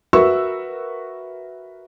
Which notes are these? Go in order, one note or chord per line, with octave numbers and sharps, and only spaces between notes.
F#4 A#4 B4 E5 C#6 E6